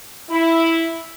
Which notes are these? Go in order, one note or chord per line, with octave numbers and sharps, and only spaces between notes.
E4